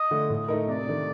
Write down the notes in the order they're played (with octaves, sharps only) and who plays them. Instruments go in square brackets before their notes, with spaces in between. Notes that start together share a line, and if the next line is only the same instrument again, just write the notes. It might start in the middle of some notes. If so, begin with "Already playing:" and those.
Already playing: [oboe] D#5
[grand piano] D3 A3
A2
A3 D#4 A#4
[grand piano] C3 [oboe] D5
[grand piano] D#3 A3 D4